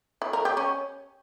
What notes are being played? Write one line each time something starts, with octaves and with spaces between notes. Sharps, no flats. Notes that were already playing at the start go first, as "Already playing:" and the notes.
E4
A#4
G4
C#4